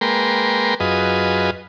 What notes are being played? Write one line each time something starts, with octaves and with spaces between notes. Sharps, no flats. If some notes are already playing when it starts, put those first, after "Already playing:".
G#3 A#3 A#4 B4 G5 C6
F#2 F4 G#4 B4 D#5